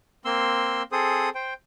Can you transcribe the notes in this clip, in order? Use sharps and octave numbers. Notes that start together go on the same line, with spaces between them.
A#3 C4 C6 E6
C4 G#4 A4 C5 D#6
C5 G5